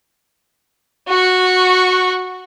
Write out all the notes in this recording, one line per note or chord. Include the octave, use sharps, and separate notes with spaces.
F#4 C#6